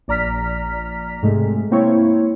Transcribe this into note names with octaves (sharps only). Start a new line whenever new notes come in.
A#1 D5 A#5 F6 B6
G#2 C3 G#3 A3
A#3 C4 E4 C#5